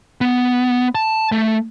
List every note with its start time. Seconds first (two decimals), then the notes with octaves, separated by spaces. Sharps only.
0.21 B3
0.95 A5
1.32 A3